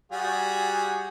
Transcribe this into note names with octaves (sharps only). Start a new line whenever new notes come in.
G3 F#4 G#4